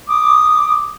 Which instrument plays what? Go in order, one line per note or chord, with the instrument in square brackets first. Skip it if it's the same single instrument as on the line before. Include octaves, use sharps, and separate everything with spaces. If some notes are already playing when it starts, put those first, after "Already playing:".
[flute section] D6 D#6